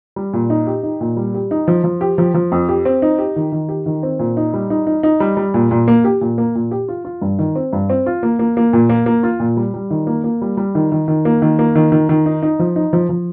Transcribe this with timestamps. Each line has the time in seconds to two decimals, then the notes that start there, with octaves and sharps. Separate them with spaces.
0.16 G3
0.33 A#2
0.50 D#4
0.67 G4
0.83 D#4
1.01 A#2
1.17 G3
1.34 G4
1.51 D#4
1.68 F3
1.84 F3
2.01 G4
2.18 F3
2.34 F3
2.52 F2
2.69 G4
2.85 C4
3.02 D#4
3.18 G4
3.36 D#3
3.52 D#3
3.69 G4
3.86 D#3
4.03 C4
4.19 A#2
4.37 D#4
4.54 G3
4.70 D#4
4.87 D#4
5.03 D#4
5.20 G3
5.37 G3
5.54 A#2
5.71 A#2
5.88 A#3
6.04 G4
6.21 A#2
6.38 A#3
6.55 A#2
6.71 G4
6.88 F4
7.05 F4
7.22 G2
7.39 D#3
7.56 C4
7.73 G2
7.90 C4
8.06 F4
8.23 A#3
8.39 A#3
8.57 A#3
8.73 A#2
8.89 A#3
9.06 A#3
9.23 F4
9.40 A#2
9.57 G3
9.74 G3
9.91 D#3
10.07 A#3
10.24 A#3
10.42 G3
10.57 G3
10.75 D#3
10.92 D#3
11.08 D#3
11.25 A#3
11.42 D#3
11.59 A#3
11.75 D#3
11.92 D#3
12.09 D#3
12.26 D#4
12.42 D#4
12.59 F3
12.76 D#4
12.93 F3
13.09 F3